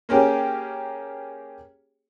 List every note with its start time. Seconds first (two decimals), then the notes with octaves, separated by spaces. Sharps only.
0.09 A#3 C#4 G4 G#4